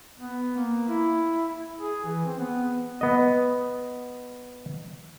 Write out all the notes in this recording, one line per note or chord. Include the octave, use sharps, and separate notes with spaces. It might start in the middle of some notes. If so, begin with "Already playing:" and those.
B3
A#3
E4
G#4
E3
C4
B3
B3 D#5